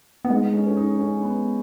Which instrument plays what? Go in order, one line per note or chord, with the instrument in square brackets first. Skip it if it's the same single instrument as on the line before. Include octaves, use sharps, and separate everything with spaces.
[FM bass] B3
[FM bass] G#3 [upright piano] D#4
[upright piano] C#4
C#4
D#4
C#4
B3